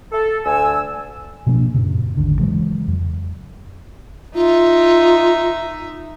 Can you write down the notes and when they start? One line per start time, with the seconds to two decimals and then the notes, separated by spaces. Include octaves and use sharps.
0.12 A4
0.46 D2 G#5 E6
1.47 B2 F3 A#3 D4
1.74 F#2 A#2 C#3
2.17 G#1 D#2 D3
2.38 C#3 E3 F#3 G#3
2.87 F2
4.35 D#4 F4 E5